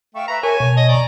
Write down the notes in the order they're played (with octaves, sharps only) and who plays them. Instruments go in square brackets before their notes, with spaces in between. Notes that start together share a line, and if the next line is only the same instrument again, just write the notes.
[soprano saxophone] A3 [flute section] F5 G5 C#6
[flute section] B4 E5 B5 [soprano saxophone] A#5
[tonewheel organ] A#4 C#6 [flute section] C#5 A5 [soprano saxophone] G#5
[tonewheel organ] B2
[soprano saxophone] D#5
[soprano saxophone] D5 [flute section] G#5 A#5 C#6